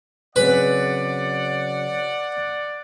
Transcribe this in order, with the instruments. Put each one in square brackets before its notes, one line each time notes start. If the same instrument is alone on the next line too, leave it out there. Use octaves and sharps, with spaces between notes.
[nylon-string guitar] C#3 F#3 C4 [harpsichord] B4 [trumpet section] D5 F#5